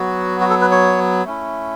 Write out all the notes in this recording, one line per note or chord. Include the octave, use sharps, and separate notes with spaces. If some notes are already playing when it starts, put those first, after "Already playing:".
Already playing: F#3 B3 F#4
F#4
A4
B4
C#5
A3 C#4 E4